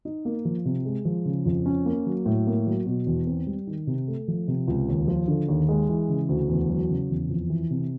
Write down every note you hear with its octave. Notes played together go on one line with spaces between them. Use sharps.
D#4
A#3
F3
C3
G#3
F3
C#3
F2
C#4
A#3
F#3
A2
A#3
F#3
B2
E2
C4
G3
D#3
C3
A3
F3
C3
C#2
D#2
F3
D3
D#2
G#3
E3
C#3
D2
E2
F#3
C#3
E2
F2
E3
C3